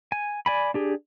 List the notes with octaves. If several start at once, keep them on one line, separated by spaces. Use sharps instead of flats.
G#5
D5 G#5 B5
D4 G4 G#4